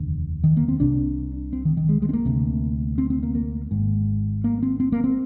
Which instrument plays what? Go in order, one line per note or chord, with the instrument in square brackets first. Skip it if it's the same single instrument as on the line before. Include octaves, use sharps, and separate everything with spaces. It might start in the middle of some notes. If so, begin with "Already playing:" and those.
Already playing: [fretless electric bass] F1 D#2 D3
D#3
A#3
C4
C2 C3 D4
C4
D#3
D#3
G#3
G#3
C4
A#3
D2 C3
C4
C4
A#3
A#3
G#1 G#2
A#3
C4
C4
A#3
C4